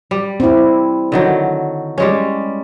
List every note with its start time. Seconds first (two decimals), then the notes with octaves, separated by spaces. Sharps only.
0.11 G3
0.40 C4 E4
1.12 D3 D#3 F#3
1.98 G3 G#3 C#4